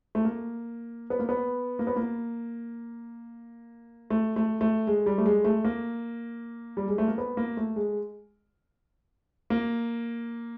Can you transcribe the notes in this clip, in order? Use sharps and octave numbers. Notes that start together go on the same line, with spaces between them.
A3
A#3
B3
A#3
B3
A#3
B3
A#3
A3
A3
A3
G#3
G3
A3
G#3
A3
A#3
G3
G#3
A3
A#3
B3
A#3
A3
G#3
A#3